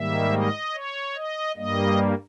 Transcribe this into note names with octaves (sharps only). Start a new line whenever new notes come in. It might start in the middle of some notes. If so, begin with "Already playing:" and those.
Already playing: G#2 D#3 G3 A#3 E5
D#5
C#5
D#5
G2 G3 A#3 D#5